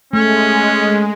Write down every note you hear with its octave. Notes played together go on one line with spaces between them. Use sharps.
G#3 A3 C#4